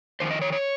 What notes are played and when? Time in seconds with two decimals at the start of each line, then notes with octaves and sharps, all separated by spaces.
0.20 F2 D#3 C5
0.31 D#5
0.41 C#5
0.52 C#5